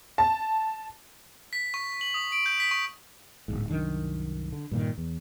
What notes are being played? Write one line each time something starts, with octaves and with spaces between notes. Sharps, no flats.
A5
B6
C#6
F#7
D#6
D7
G6
B6
C#6
D1 G1 G#2
C2 F#2 D#3 D4
D3
G2 A#2 D#3
E2